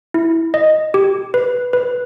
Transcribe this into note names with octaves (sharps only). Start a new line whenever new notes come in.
E4
D#5
G4
B4
B4